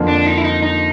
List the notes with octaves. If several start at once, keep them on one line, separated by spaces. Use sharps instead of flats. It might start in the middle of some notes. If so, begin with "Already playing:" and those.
Already playing: F2 D3 F3 A#3
D4
D#4
E4
D#4
D#4